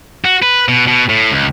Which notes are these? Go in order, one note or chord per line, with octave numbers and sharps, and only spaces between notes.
F#4
B4
B2
B2
A2
C#2